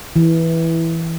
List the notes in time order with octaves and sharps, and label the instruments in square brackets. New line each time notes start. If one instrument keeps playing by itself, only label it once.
[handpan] E3